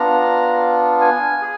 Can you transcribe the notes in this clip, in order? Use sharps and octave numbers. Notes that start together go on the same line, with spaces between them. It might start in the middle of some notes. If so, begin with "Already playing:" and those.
Already playing: B3 D4 F4 A#5
G#5
G#4